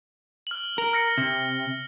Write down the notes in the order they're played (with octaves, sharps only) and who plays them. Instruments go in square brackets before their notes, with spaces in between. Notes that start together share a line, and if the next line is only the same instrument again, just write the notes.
[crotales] F6 F#7
[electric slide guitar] A#4
[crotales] F6 A#6 C#7
[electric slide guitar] C3